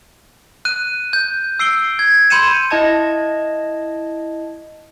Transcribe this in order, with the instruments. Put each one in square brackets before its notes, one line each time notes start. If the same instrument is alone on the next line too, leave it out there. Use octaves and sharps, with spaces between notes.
[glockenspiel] F#6 D#7
G6
E6 C7 D7 G7
G#6
B5 C6 G6 C#7 D#7 E7
[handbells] E4 D#5 A5 G#6